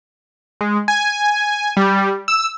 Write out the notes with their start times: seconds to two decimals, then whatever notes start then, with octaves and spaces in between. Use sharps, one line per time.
0.61 G#3
0.88 G#5
1.77 G3
2.28 E6